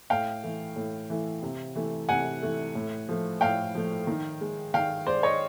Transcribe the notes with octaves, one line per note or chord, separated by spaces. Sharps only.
A2 F5 G5
E3 A3
A2
E3 A3
C3
E3 A3
C3 F#5 G#5
E3 A3
A2
F3 A3
A2 F5 G5
F3 A3
D#3
G#3
D#3 F5 G5
G#3 C5 D5
C#5 D#5